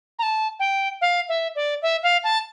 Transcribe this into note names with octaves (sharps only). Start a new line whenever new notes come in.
A#5
A5
G5
F5
E5
D5
E5
F5
A5